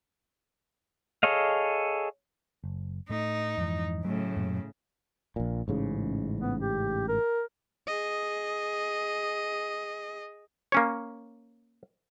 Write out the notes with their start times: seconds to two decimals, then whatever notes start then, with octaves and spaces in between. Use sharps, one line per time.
1.23 G#4 A4 C#5 D#5 F5
2.64 F#1
3.09 A2 A3 D#4
3.58 F2 G#2 E3
4.05 A2 C#3 F#3 A3
4.36 F#2 A#2 F#3
5.36 A#1 A#2
5.68 A1 G#2 C#3
6.41 B3
6.60 G4
7.08 A#4
7.87 G#4 D#5
10.72 A#3 C#4 C#5